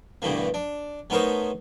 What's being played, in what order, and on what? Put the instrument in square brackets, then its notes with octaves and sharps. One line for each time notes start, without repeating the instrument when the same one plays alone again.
[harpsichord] G2 B2 D3 E3 A3 A#3
D4
A3 B3 D#4 A#4 C5 C#5